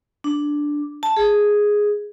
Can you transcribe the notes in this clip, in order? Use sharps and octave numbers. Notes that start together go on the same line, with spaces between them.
D4
A5
G#4